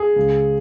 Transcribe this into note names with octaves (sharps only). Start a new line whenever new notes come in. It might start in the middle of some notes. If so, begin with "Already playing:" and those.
Already playing: G#4
C#2